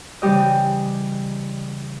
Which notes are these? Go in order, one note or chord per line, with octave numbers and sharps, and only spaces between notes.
C#3 E3 G3 G4 D#5